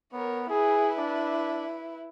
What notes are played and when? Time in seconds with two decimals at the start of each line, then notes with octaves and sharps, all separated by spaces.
0.13 B3 A#4 C#5
0.49 E4 G#4 B4
0.98 D4